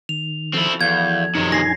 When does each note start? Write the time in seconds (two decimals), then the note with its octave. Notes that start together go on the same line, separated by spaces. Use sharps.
0.09 D#3 F7
0.53 F3 C4 E4 F#4 A4
0.81 E2 F5 G6 G#6
1.35 A#1 F#2 C3 D#3 D#4 A#5
1.52 D#4 G#5 G#6 A#6 C7